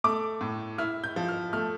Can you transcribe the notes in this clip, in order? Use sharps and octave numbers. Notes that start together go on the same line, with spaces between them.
A3 D6
A2
E4 F6
G6
F3
F6
A3 F6